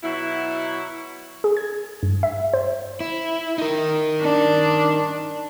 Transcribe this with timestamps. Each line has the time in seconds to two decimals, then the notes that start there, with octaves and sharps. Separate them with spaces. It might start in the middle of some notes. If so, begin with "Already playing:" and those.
0.03 B2 F#3 E4
1.44 G#4
1.57 G#6
2.03 G2
2.23 E5
2.53 C5
3.00 E4
3.58 D#4 A#4
4.22 D4